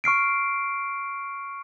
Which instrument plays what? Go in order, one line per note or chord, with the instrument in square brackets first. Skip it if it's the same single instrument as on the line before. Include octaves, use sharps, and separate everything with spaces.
[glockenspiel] C#6 F6 C7 D7